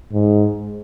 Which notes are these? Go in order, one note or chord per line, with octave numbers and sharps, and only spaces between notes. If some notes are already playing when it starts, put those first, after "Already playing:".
G#2